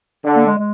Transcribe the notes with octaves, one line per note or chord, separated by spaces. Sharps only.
D3
A#3
G#3
G#3